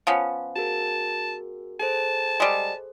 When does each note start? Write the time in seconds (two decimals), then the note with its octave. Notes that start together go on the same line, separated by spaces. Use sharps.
0.07 F3 B3 C#4
0.56 F#4 G#4 A#4 A5
1.80 G#4 A4 C5 A5
2.40 G3 G#3